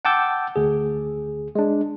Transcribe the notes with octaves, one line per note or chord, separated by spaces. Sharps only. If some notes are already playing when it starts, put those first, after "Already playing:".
F#5 G5 A5 D6 E6 G6
D2 G#4
G#3 D4